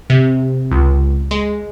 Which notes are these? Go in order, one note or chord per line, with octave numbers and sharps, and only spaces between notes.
C3
C#2
G#3